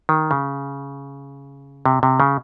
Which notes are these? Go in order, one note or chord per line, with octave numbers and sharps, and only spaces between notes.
D#3
C#3
C3
C3
C#3